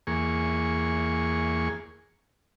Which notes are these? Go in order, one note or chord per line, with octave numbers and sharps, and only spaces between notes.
E2 A#3 G#4 C#6